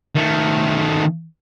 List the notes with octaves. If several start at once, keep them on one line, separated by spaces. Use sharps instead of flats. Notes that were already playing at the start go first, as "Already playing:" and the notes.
D#3 A3